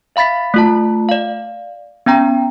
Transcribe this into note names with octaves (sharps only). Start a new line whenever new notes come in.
E5 F5 B5 A6 B6
A3 F4 A5
D5 F5
B3 C#4 G5 A#5